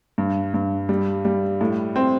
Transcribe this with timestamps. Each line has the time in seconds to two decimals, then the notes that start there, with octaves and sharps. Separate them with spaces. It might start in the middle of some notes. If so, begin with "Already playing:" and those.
0.18 G2
0.54 G2
0.89 G3
1.25 G3
1.61 A2
1.96 C4